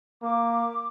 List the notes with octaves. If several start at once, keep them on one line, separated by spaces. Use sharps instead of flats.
A#3 D6